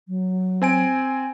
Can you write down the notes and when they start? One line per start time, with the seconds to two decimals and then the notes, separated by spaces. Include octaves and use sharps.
0.08 F#3
0.62 C4 G#5 D7